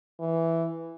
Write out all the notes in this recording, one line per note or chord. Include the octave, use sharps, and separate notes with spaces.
E3